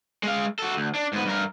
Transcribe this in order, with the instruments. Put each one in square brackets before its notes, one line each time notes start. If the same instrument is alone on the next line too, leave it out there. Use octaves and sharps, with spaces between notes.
[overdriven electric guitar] G#3 F5
F#4 A4
D2
D4
G#2 B3
G2 A#4